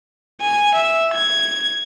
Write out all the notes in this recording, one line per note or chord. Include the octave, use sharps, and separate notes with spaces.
G#5
E5
G#6